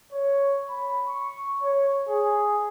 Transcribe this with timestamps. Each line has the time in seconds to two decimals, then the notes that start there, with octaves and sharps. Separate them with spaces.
0.12 C#5
0.69 B5
1.07 C#6
1.62 C#5
2.09 G#4